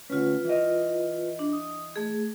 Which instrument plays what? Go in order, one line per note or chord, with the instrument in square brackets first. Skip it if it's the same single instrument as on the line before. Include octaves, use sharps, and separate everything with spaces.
[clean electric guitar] D2 G#2 C#4 [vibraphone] F4 B4
[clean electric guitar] E3 D#5
[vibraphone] D4
D#6
A3 G#4